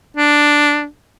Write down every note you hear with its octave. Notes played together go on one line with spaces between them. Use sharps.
D4